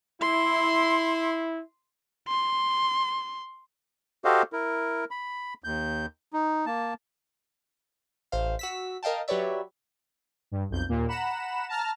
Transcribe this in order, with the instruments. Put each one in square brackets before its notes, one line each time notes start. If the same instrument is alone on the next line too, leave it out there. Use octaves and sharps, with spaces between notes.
[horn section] E4 [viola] C6
[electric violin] C6
[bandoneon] F#4 G4 A4 C5 D#5 F5
E4 A#4
B5
D#2 G6
D#4
A#3 A5
[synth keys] A1 C5 F5
F#4 E6 B6
A#4 D#5 F5 G5 A5
F#3 G4 B4 C#5 D5 E5
[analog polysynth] G2
B1 F2 G6
D#2 A#2 A#3
F#5 A#5 B5 E7
A5 A#5 F6